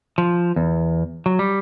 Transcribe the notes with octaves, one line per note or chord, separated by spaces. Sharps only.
F3
E2
F#3
G3